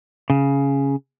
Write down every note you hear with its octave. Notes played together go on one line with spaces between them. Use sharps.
C#3